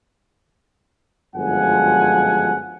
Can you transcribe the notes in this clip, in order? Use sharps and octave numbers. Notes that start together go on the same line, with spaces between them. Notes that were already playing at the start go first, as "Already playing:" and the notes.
G1 F#2 F3 G#3 F#5 G#5